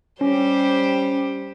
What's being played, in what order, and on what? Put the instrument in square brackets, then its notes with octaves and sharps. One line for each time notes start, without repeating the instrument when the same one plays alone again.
[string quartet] G3 G4 C5 [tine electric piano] C#4